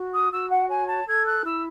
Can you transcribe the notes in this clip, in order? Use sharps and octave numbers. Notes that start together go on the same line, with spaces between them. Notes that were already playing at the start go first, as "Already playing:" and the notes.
Already playing: F#4
D#6
F#4 E6
F#5
C#5 G#5
A5
A4 G#6
F#6
E4 E6